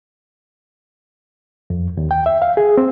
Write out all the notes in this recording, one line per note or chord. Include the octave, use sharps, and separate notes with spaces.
F2
D#2
G5
E5
F5
G#4
C4